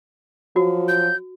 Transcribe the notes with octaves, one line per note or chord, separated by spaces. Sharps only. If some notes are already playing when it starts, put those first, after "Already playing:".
F3 F#3 F#4
G6